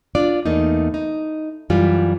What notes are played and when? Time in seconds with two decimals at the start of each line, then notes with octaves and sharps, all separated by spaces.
0.15 D4 F4 D5
0.45 E2 A3 A#3 D#4
0.94 D#4
1.70 F#2 E3 G3 F4